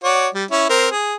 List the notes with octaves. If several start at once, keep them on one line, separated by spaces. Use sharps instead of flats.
F#4 C#5 D5
G3
C#4 E4
C4 A#4 C5
G#4